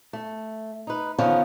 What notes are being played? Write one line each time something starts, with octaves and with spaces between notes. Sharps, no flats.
A3
D#4 B4
D3 D#3 F3 B3 C#4